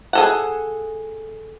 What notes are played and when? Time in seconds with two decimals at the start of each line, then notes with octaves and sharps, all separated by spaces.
0.13 G#4 A4 F#5